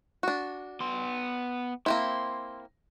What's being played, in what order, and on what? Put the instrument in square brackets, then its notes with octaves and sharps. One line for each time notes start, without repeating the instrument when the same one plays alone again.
[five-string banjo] D4 F#4
[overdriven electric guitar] B3 C6
[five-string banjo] A#3 C4 E4 [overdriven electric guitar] C6